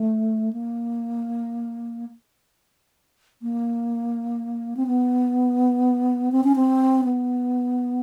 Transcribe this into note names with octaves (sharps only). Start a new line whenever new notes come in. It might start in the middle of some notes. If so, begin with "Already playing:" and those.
Already playing: A3
A#3
A#3
C4
B3
C4
C#4
C4
B3